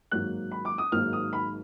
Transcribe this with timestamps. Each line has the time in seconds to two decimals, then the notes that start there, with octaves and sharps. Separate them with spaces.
0.11 G#1 G#2 F#3 A#3 F#6
0.52 B5
0.65 D6
0.78 D#6
0.92 G#1 G#2 F#3 A#3 F6
1.13 D#6
1.33 B5